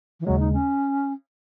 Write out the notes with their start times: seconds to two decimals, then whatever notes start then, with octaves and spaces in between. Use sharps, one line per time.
0.20 E3
0.26 D#2 C#3 F#3 G#3
0.40 D#4
0.53 C#4